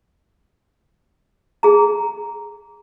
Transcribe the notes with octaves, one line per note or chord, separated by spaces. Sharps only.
G#4 A#5